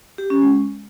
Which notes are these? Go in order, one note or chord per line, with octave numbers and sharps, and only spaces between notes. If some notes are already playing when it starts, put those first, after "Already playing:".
G4
C#4
G#3